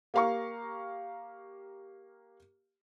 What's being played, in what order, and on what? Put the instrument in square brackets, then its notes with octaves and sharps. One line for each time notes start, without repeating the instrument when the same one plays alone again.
[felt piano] A#3 G4 F5 A#5 C#6